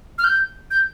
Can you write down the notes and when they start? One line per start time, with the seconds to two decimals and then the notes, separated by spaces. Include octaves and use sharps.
0.18 F6
0.24 G6
0.71 G6